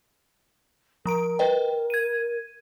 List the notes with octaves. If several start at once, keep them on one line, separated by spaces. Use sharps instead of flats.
F3 A#4 A#5 D7
B4 D#5 G5
G#6 D#7